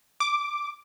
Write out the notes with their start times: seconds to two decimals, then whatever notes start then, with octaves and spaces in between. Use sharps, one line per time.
0.20 D6